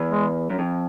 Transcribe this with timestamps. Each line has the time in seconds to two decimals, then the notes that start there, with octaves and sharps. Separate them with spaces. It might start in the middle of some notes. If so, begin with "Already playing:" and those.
Already playing: E2
0.10 G#3
0.50 F#2
0.59 F2